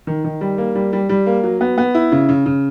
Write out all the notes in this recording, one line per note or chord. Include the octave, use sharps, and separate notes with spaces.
D#3
D#3
G3
A#3
G3
G3
G3
A#3
F#3
B3
B3
E4
C#3
C#3
C#3